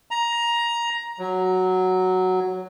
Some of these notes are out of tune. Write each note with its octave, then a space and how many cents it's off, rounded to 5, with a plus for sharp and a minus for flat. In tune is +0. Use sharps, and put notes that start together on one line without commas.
A#5 +15
F#3 +0